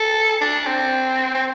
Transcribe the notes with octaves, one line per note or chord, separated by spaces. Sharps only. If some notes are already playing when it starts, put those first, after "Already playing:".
Already playing: A4
D4
C4
C4